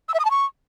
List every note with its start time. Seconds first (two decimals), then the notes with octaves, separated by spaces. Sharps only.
0.09 E6
0.14 E5
0.20 D#6
0.25 A5
0.31 C#6